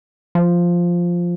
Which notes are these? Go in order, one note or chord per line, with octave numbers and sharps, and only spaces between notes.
F3